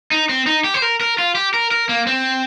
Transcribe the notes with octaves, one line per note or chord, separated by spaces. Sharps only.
D#4
C4
D#4
G4
C5
A#4
A#4
F4
G4
A#4
A#4
A#3
C4